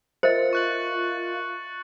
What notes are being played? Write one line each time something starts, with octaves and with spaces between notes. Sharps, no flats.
F4 A#4 C5 D#5 E5 A6 C#7
C#6 F#6 F#7